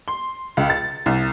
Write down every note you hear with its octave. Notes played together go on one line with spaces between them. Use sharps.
C6
C#2
A6
C2